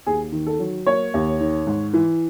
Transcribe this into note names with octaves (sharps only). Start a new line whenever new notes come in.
D#2 G#4
D#3
A4
F#3
A#3 C#5
D#2
D#3
G#2
E3